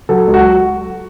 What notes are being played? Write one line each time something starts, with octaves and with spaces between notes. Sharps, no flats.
F#3 A4
C#2
F#4